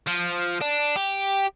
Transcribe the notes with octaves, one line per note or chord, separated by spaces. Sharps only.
F3
D4
G4